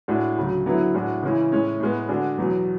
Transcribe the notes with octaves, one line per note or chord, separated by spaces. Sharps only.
A2 G#3 D4 F#4
D2 C#3 F#3
D3 F#3 B3 E4
A2 G#3 D4 F#4
C#3 E3 G#3 C#4 E4
A2 G#3 C#4
A2 G#3 B3
D3 G#3 D4 F#4
E2 B2 F#3